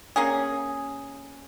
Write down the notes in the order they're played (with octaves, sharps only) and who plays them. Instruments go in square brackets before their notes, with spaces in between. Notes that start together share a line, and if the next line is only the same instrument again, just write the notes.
[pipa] A#3 C#4 G#4